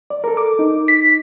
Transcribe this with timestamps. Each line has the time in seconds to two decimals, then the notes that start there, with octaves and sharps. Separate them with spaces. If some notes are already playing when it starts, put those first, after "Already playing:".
0.10 D5
0.24 A4 A#4
0.37 D6
0.59 D#4
0.88 B6